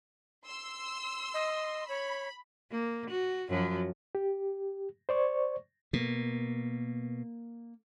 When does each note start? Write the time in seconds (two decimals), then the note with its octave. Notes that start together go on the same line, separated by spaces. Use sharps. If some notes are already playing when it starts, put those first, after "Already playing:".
0.46 C6 E6
1.34 D#5
1.89 C#5 B5
2.72 A#3
3.10 F#4
3.49 F#2 F3 F#3
4.15 G4
5.09 C5 D5 C#6
5.93 B2 A#3